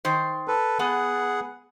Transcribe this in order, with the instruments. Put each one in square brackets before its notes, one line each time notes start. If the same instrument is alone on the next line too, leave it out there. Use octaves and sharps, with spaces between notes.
[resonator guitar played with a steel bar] D#3 C5
[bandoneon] A4 B4
[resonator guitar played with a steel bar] B3 [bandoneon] G#4 F#5